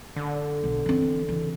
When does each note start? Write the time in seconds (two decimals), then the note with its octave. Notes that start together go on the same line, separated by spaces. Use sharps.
0.16 D3
0.64 B1
0.86 E3 C4
1.29 C#3 E3